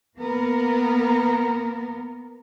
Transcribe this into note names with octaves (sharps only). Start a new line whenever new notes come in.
A#3 B3 A#4